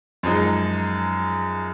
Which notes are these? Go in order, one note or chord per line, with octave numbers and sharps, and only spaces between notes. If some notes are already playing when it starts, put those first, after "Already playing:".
F#2 F3 G#3 D#4 G#4